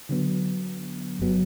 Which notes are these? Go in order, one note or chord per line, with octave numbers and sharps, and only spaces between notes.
D3 F#3 B3
G1 F#3 B3